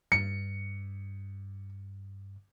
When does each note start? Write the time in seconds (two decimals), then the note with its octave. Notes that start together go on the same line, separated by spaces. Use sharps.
0.12 G2 C#7